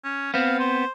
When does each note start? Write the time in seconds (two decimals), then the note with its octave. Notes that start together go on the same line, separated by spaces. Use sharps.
0.04 C#4
0.34 B3 C4 F5
0.59 C5